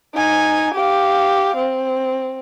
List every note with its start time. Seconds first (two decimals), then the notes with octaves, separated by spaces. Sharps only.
0.15 D#4 G#5
0.75 G4 F5
1.56 C4